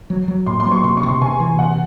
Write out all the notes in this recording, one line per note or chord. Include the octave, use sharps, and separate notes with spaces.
F#3
F#3
A2 C6
C6
F#3
C#6
C3 C6
C#6
C3
C6
C3 G#5
E3
C3 F#5